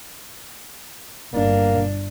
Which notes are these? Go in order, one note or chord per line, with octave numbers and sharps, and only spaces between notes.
G1 A#3 D4